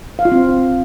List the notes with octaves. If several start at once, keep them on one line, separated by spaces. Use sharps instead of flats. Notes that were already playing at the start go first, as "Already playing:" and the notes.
F5
F4
C4